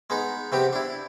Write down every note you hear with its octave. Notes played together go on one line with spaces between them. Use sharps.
G#3 B3 D#4
C3 B3 C4 G4
D4 E4